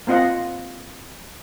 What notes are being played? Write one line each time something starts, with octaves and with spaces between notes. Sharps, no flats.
A#3 C4 F4 D#5 F#5